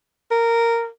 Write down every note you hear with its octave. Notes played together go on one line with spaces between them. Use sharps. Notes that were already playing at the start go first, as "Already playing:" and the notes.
A#4